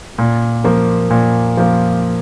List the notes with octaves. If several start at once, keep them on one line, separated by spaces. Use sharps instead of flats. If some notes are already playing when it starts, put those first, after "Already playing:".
A#2
F3 A#3
A#2
F3 A#3